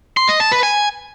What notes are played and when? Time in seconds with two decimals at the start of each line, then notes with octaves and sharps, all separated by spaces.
0.17 C6
0.29 D#5
0.40 A5
0.52 B4
0.63 G#5